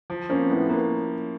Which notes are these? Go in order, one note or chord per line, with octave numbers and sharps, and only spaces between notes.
F3
A#3 C4 C#4
A2 A3 B3
A#3 B3